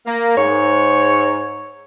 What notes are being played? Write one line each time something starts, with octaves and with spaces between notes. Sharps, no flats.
A#3
G#2 C#5